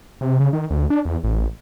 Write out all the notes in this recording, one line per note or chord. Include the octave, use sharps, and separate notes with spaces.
C3
C#3
D#3
D2
D4
E2
A1